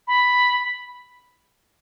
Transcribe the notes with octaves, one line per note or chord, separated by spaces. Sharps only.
B5